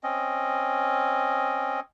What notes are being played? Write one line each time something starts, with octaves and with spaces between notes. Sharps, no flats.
C4 C#4 D#5